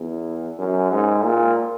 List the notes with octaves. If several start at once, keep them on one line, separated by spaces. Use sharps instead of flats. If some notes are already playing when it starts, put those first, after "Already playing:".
Already playing: E2
F#2
G#2
A#2